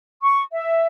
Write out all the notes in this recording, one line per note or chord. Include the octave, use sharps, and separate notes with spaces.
C#6
E5